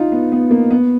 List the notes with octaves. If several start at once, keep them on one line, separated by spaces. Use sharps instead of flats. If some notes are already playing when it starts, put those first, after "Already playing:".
Already playing: D#4 F4
B3
B3
A#3
B3